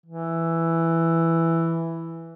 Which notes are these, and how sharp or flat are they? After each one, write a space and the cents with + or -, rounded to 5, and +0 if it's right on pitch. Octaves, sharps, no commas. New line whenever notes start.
E3 +5